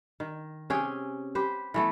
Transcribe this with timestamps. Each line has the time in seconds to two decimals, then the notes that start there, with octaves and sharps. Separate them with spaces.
0.20 D#3
0.70 C3 C#4 G#4 G5
1.35 G4 B4 C5
1.74 E3 A3 B3